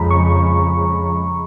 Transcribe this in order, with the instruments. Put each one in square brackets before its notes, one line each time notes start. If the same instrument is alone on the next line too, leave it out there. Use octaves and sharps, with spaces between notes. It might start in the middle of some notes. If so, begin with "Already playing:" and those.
Already playing: [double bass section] F2 C#3 F3 G#3 [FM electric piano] A#5 B5
[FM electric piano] C#6